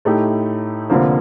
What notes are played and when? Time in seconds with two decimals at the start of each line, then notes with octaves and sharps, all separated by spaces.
0.05 A2 A3 D#4 G4
0.90 F1 F2 D3 F3 A#3